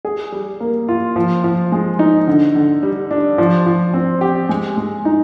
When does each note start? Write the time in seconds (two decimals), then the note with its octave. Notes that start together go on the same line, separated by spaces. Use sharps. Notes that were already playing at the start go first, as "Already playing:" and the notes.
0.05 G#4
0.32 G3
0.60 A#3
0.88 F4
1.16 F3
1.44 F3
1.72 G#3
1.99 D#4
2.27 D3
2.55 D3
2.83 G3
3.11 D4
3.38 F3
3.66 F3
3.94 C4
4.21 G4
4.49 G#3
4.77 G#3
5.05 D#4